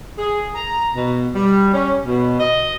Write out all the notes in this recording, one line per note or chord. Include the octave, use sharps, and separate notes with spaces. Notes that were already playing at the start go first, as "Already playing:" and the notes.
G#4
A#5
B2
G3
C#4
B2
D#5